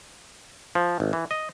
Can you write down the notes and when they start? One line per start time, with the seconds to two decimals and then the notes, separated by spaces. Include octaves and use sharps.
0.75 F3
1.00 G#1
1.13 E3
1.31 D#5